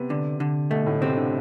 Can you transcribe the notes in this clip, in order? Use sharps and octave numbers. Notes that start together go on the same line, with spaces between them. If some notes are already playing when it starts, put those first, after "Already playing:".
Already playing: C3 B3
D3
D3
B2 A3
A2
C3 C4
D3